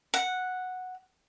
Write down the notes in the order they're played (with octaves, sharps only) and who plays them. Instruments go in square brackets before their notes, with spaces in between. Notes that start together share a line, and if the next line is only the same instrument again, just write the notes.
[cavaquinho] F#5